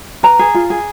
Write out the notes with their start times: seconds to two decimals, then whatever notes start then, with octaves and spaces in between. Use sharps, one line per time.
0.23 B4 A#5
0.39 G#4
0.54 F4
0.70 G#4